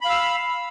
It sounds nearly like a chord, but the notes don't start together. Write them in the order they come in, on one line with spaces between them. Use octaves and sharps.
B5 F5 E6